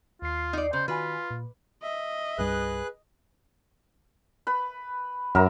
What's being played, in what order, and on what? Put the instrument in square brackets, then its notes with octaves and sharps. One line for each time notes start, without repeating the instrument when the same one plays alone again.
[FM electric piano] D#2 C7 [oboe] F4
[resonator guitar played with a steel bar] D#4 D5
[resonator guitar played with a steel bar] C#3 [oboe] C5
[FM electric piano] D#3 F#4 G#5 [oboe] F4 [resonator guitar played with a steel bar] B4
[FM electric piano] A#2
[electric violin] D#5 [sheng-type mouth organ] E5
[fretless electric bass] C2 G2 G3 [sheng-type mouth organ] G#4 B4 F#6
[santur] B4 B5
[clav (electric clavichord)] F#2 [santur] A#4 E5 A#5